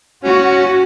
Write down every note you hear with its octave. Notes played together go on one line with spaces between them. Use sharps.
C#4 F#4